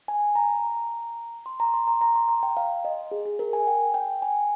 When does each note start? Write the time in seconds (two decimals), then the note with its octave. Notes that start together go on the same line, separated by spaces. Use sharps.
0.08 G#5
0.35 A#5
1.46 C6
1.60 A#5
1.74 C6
1.88 A#5
2.01 A#5
2.15 C6
2.29 A#5
2.43 G5
2.57 F5
2.85 D#5
3.11 G#4
3.26 G#4
3.39 A#4
3.53 G#5
3.67 G5
3.94 G5
4.22 G#5